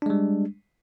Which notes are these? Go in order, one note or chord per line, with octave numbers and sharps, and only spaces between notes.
G3 G#3 D4